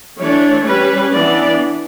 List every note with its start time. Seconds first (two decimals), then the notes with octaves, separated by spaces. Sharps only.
0.19 E3 A3 D4 C#5
0.66 G3 C#4 B4
1.13 E3 B3 D4 D5